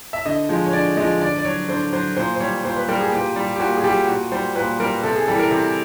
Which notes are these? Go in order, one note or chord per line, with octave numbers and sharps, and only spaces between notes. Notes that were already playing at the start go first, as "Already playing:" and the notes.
E5
D3 D#5
F3 G#3
C#5
D3 D5
F3 G#3 D#5
D3 D5
D5
F#3 C#5
D3 C5
F#3 C5
A#2 C5
C5
G3 C#5
A#2 C5
B4
G3 A#4
G#4
A#2 G4
G3
G4
A#2 F#4
G#4
G3 G4
A#2 F#4
G3 C5
A#2 B4
G3 A#4
C3 A4
G#4
E3 G3 A4
A#4
C3